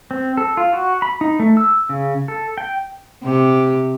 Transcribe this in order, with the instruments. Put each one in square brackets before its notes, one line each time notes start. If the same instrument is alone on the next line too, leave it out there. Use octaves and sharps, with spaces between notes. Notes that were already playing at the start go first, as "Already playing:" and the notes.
[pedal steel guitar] C4
A4
F4
F#4
B5
D#4
A3
E6
C#3
A4
G5
[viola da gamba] C3 G4